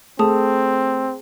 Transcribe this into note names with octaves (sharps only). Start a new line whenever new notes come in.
A3 C4 G#4 A4 A5 D#6